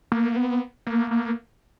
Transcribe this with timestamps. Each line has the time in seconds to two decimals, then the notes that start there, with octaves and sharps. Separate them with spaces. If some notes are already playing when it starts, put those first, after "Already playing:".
0.12 A#3
0.36 B3
0.87 A#3
1.11 A#3